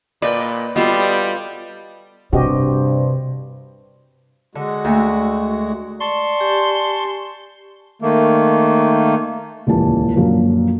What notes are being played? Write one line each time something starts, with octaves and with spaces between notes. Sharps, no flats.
A#2 B4 D5 D#5 G5
G3 B3 F4 F#4 A4 D#5
G2 C3 F#4 G4 C5 D#5
D3 G#3 F#4
D2 A3
D5 A5 C6 C#6
G4 G#5
D#3 A3 A#3
D#1 C#2 E3 A5
F#2 A#2 D3 F3